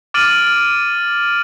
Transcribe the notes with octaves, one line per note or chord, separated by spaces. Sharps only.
D6 F6 A6 D7 D#7 F#7